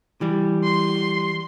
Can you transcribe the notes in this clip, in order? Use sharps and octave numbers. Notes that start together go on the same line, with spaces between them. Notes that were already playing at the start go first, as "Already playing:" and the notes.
E3 G3
C6